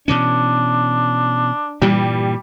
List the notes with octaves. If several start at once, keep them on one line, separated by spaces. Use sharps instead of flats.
B2 E3 C#4 D4
G2 A#2 E3 G3